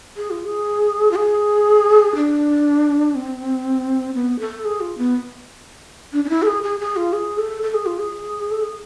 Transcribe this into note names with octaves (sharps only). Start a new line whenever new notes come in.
G#4
F4
G#4
F4
G#4
D4
C4
B3
A4
G#4
F4
B3
D4
D4
E4
A4
G#4
G#4
G#4
F4
G#4
A4
A4
G#4
F4
G#4
A4
G#4